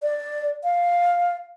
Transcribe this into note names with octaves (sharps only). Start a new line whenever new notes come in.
D5
F5